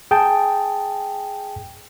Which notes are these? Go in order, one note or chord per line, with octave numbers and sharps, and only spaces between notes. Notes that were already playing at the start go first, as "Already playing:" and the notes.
G#4 G5 A5